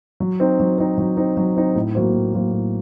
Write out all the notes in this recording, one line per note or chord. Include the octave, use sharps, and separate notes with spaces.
F#3
C4 D#4
F#3
C4 D#4
F#3
C4 D#4
F#3
C4 D#4
A2
F#3 A#3 F#4 C5
A2
F#3 A#3 F#4 C5
A2